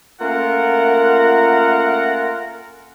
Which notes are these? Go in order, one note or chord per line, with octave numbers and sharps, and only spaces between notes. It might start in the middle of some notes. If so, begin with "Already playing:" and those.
A3 A#3 C#4 F4 A#4 F#5